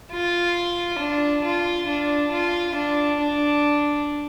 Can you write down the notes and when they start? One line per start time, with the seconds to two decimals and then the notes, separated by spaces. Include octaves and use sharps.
0.12 F4
0.99 D4
1.44 F4
1.88 D4
2.32 F4
2.75 D4
3.20 D4